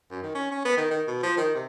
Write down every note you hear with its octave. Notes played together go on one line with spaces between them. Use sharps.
F#2
D#3
C#4
C#4
B3
D#3
D#3
B2
F3
D#3
C3